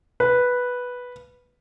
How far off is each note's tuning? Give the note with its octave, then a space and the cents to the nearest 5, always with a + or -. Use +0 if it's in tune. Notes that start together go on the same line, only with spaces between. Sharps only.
B4 -5